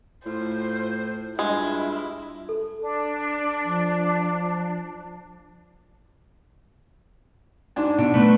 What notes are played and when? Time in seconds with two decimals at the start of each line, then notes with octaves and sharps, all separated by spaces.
0.26 A2 F4 C5
1.39 G2 G#3 E4 F4
2.49 A4
2.81 D4
3.64 F3
7.76 G#2 D4
7.99 B2 D4
8.14 A3 B3